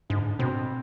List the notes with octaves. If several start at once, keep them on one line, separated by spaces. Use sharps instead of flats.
G#2 D3
B2 C4